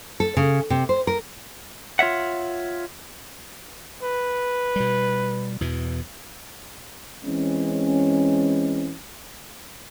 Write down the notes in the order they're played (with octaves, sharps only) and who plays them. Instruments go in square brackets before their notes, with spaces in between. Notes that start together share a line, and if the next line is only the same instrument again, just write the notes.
[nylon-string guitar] A4
C#3
C3
C5
A#4
[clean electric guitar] F4 C#5 E5 F#5
[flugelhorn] B4
[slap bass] B2 G3
E2 B2 E3
[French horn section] E3 G#3 C4 C#4